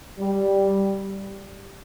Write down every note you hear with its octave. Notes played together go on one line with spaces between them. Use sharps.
G3